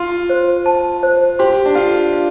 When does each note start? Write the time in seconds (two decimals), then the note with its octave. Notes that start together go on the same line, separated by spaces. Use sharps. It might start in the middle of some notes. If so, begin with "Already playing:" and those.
Already playing: F4 C6
0.29 C5
0.66 A5
1.03 C5
1.39 G4 C6
1.66 D4
1.75 F4 A4
2.13 F5